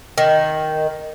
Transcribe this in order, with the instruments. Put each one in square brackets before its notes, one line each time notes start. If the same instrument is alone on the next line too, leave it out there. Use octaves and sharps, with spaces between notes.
[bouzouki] D#3